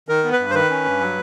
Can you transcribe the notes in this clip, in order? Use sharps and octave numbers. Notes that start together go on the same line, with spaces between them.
D#3 A#4
B3
B4
G2
C5
D#3 B4
C#4
G2
F#3